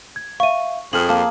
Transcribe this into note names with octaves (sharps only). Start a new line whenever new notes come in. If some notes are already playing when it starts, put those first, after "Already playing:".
G#6
E5 F5 C#6 D#7
F2 G#4 F6 F#7
A#3 A5